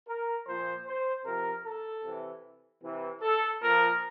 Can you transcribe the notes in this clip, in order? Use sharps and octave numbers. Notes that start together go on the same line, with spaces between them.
A#4
A#2 F3 C5
C5
C3 F3 A#4
A4
C3 E3
C3 E3
A4
A#2 F3 A#4